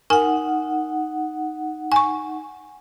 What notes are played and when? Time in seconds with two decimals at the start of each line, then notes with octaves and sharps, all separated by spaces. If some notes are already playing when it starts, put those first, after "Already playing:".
0.10 D#4 A#4 F#5 G#5
1.92 G#5 C#6